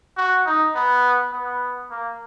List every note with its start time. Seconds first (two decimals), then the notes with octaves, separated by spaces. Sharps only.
0.17 F#4
0.46 D#4
0.75 B3
1.32 B3
1.91 A#3